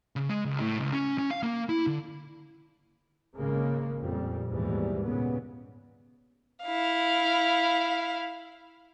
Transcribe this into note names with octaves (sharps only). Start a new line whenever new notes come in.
C#3
G#3
C#2
A2
C#2
C#4
C#4
F5
A#3
E4
D3
G#1 C#3 G#3 A#3
F2 A#2 G3
D#2 G#2 B2 E3 G3
A#2 C#3 B3
E4 F5